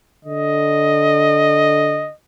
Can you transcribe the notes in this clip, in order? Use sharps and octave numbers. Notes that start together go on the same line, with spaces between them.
D3 D#5